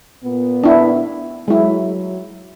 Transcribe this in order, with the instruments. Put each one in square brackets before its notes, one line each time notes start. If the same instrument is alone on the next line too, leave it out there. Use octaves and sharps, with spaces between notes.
[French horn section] A#2 B3
[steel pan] D4 E4
[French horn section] F#3 [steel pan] G#3 E4